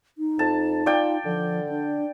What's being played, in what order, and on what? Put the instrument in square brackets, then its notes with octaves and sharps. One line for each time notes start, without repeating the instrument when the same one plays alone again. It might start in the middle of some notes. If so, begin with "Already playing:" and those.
[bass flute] D#4
[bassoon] F2 [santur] A5
[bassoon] F4 [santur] D5 G5
[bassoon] D3 [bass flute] F3
[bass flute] D4